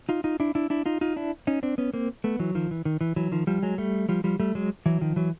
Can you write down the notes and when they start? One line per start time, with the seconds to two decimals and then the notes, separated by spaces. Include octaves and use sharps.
0.09 D#4 F4
0.24 D#4 F4
0.40 D4 E4
0.55 D4 E4
0.70 D4 E4
0.86 D#4 F4
1.01 D#4 F4
1.16 D4 E4
1.47 C#4 D#4
1.63 C4 D4
1.78 B3 C#4
1.94 A#3 C4
2.24 A3 B3
2.39 E3 F#3
2.55 D#3 F3
2.71 E3
2.85 D#3
3.01 E3
3.16 E3 F#3
3.32 D#3 F3
3.47 F3 G3
3.62 F#3 G#3
3.78 G3 A3
4.09 F3 G3
4.24 F3 G3
4.40 G3 A3
4.55 F#3 G#3
4.86 E3 F#3
5.01 D#3 F3
5.16 E3 F#3